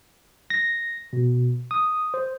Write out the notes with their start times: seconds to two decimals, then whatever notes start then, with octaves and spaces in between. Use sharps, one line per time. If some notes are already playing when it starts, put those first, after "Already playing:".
0.50 A#6
1.13 B2
1.71 D#6
2.14 C5